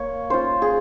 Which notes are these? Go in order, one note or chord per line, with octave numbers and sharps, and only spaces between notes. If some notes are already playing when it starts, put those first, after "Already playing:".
Already playing: A#3 C#5
C#4 F4 C5
G#4